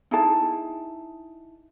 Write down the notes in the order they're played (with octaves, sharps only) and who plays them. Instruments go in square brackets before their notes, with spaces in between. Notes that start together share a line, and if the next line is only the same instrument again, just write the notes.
[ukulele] D#4 E4 G#4 A5